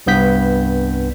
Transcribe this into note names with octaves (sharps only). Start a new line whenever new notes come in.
C2 G2 B3 G6 B6